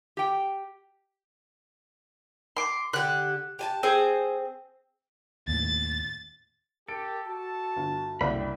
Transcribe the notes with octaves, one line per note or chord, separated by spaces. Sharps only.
G4 G5
C6 D6
D3 G4 F#6
G4 G#5 A5
C4 G#4 C5
D#2 A2 A6
G4 A4 A#4 D7
F#4 A5
G1
F#1 C2 D4 G5 B5